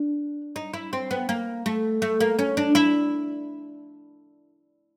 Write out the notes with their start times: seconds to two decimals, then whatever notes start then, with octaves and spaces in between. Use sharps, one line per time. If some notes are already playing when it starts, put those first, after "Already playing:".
Already playing: D4
0.56 D#4
0.73 E4
0.93 C4
1.11 B3
1.29 A#3
1.66 A3
2.02 A3
2.20 A#3
2.39 C#4
2.57 D4
2.75 E4